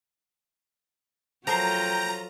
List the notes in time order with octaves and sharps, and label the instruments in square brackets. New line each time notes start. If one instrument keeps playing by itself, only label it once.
[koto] F3 A#4 C5 [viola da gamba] F#3 F4 A4 [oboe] G5 [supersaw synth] A#5